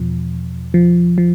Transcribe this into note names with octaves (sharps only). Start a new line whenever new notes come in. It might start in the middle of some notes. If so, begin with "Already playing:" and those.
Already playing: E2 B2 F3
F3
F3